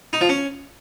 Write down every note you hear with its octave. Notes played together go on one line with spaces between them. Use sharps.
D#4
F3
C#4